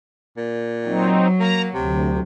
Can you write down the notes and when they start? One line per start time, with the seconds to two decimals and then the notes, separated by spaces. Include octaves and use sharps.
0.37 A#2
0.85 F#3 C4 D#4
1.40 A#3 A#5
1.74 D2 C3